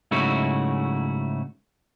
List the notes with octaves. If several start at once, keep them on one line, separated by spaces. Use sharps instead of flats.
G#2 C#3 F#3 A3 E4 F#4